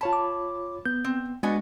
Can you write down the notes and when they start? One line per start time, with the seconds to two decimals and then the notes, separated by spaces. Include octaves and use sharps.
0.01 F4 C#5 A5 B5
0.13 D6
0.86 B3 G6
1.04 C4
1.43 G#3 B3 D4 F#4 D#5 G#5